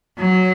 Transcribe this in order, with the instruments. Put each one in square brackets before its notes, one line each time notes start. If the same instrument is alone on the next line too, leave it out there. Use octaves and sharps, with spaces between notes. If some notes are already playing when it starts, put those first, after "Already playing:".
[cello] F#3